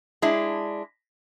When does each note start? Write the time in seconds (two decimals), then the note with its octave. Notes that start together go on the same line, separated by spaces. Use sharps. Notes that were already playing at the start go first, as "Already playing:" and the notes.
0.22 G#3 D4 E4